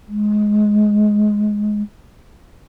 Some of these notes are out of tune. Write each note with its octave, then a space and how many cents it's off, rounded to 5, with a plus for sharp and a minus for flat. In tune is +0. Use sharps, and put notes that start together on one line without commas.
G#3 +10